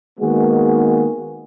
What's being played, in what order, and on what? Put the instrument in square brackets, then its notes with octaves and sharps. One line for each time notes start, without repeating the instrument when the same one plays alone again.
[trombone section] D#3 G#3 A#3 B3 F#4 G#4